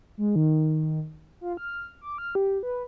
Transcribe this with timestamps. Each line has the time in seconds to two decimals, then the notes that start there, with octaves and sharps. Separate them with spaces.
0.17 G#3
0.36 D#3
1.41 F4
1.57 F6
2.01 D6
2.18 F6
2.35 G4
2.63 B4